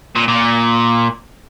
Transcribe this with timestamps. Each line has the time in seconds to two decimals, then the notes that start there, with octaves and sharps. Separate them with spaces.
0.16 A#2
0.28 A#2